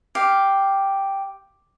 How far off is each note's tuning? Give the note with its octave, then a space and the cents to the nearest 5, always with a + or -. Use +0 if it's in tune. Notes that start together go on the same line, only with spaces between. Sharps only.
G4 +0 F5 +0